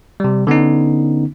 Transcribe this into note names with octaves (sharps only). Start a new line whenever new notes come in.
C3 G3
D3 B3 C#4 D#4